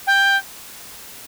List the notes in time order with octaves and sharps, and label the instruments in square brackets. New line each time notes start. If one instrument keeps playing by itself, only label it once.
[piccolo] G5